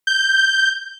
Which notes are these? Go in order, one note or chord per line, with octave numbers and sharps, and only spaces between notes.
G6